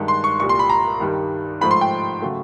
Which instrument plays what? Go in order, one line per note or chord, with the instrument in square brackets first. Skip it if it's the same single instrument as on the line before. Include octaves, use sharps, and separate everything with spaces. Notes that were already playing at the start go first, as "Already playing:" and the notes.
Already playing: [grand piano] G2 D#3 G#3
C6
C#6
C2 A#2 G3 C#6
C6
B5
A#5
G2 D#3 G3
G#2 F3 A3 B5
C6
G5
C#3 F#3 A3